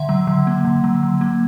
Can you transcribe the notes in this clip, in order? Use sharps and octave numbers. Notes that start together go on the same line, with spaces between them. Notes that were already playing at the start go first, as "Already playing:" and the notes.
Already playing: D3 E5
F#3
D3
A#3
D3
F#3
D3
A#3